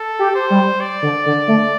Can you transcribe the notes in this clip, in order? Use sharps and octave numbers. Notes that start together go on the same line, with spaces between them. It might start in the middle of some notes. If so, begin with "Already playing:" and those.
Already playing: A4
G4
C5
G3
D5
D3
D3
A3